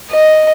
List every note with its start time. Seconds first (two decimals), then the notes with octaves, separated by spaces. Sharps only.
0.11 D#5